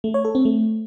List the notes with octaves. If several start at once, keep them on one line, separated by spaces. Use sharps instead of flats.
A3
C#5
A4
C4
A3